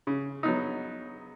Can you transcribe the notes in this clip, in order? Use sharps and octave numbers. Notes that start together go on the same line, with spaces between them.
C#3
F#3 B3 D#4